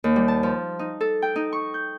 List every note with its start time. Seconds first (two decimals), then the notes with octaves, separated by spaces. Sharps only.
0.04 D#2
0.16 G3
0.28 A5
0.43 F3
0.79 D#4
1.01 A4
1.22 G5
1.36 D#4
1.53 C#6
1.74 G6